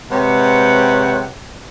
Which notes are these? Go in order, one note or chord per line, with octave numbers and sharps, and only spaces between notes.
C3 G#3 B4 C#5 F#5 G5